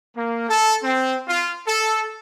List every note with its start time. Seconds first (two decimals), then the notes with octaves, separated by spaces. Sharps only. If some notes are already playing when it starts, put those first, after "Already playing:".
0.17 A#3
0.49 A4
0.83 C4
1.27 F4
1.67 A4